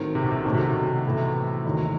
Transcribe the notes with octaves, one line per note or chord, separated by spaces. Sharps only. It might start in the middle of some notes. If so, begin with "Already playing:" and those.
Already playing: A2 D#3 F#3 C4
C3
B2
C3
B2 D#3 F#3 A3 D#4
C3
B2
A2 E3 A3 E4
E1 D#2 D#3 F#3